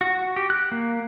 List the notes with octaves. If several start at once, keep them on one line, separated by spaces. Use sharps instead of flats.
F#4
G4
F#6
A#3